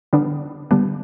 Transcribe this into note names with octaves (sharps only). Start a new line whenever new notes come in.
D3 G3 B3 D4
D3 G3 B3 D4